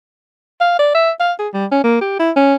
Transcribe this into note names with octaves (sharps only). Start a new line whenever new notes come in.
F5
D5
E5
F5
G#4
G3
C#4
A#3
G4
E4
C#4